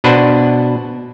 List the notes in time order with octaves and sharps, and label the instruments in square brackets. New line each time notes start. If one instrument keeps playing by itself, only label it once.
[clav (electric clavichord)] B2 D4 B4 C5 F#5